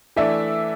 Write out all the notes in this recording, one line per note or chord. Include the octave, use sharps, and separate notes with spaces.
E3 A3 D4 E5